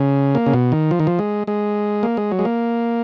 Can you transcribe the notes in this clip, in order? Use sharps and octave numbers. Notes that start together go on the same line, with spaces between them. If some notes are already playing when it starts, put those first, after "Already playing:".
Already playing: C#3
A#3
C#3
B2
D#3
F3
D#3
F3
G#3
G#3
A#3
G#3
F#3
G#3
A#3